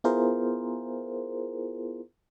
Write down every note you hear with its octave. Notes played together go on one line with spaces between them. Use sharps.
B3 E4 F4 G#4 A#4 C5